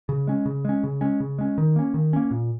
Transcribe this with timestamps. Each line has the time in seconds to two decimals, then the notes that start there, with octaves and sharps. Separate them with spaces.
0.09 C#3
0.27 G#3 C#4
0.46 C#3
0.65 G#3 C#4
0.84 C#3
1.01 G#3 C#4
1.20 C#3
1.38 G#3 C#4
1.58 D#3
1.76 A#3 C#4
1.94 D#3
2.13 A#3 C#4
2.31 A#2